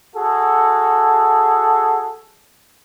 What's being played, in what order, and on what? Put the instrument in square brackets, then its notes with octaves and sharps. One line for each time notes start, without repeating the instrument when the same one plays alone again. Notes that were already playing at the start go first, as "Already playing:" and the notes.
[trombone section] F#4 G#4 A4